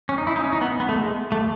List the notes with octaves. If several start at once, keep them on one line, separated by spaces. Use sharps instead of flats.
C#4
D#4
E4
D#4
C#4
D#4
B3
B3
A3
G#3
A3